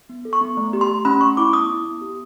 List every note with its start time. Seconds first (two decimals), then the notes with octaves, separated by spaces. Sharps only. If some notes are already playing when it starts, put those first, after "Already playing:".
0.09 B3
0.25 A4
0.33 C#6
0.41 B3
0.57 A3
0.73 G4
0.81 C6
0.89 A3
1.05 C#4 B5
1.21 A3 C#6
1.37 E4 D6
1.53 B3 D#6
1.70 E4
1.86 B3
2.01 G4